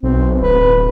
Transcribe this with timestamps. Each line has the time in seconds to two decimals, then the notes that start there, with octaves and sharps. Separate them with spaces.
0.03 B1 C4
0.41 D1 B4